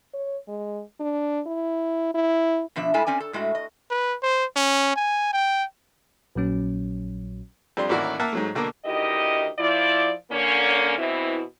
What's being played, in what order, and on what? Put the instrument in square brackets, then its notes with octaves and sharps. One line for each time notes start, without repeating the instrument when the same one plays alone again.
[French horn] C#5
G#3
D4
E4
E4
[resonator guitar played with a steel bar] B2 F3 D4 E5
A2 G#3 E4 A4 G#5 A5
C4 C#4 D5 G#5
A4
A2 G#3 A3 F#4
D#5
[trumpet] B4
C5
C#4
G#5
G5
[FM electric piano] A#1 A#2 F#3 C#4
[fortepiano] F2 G3 D4 C6
A1 D#2 E4 F#4 A#4 D5
A#3 A#4 E5 F#5 A5
G#2 F#3 A3
B2 D3 A#3 A#4
[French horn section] D2 D#3 E4 G4 D#5
F3 E4 D5
D3 A#3 C#4
B2 E3 C4 E4